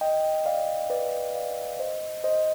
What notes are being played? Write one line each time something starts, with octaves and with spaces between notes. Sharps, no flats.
D#5 G5
D5 F5
B4 D5
D5 F5
F5
C5 D#5
C5 D#5